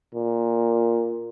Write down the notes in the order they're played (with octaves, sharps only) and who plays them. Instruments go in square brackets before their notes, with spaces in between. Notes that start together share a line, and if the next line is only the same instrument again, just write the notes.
[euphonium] A#2